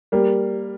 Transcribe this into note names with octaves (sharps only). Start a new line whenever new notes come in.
G3 A#3